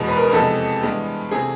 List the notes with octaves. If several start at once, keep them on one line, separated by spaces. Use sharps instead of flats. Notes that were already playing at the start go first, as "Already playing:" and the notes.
Already playing: E2 B2 G#3 B3
B4
A#4
A#4
F2 C3 E3 G#3 B3 A4
G2 E3 G#3 B3
C3 E3 A3 G#4